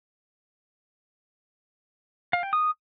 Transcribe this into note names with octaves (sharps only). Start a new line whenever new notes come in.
F5
G5
D#6